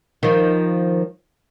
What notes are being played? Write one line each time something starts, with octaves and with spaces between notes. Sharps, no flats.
D#3 F3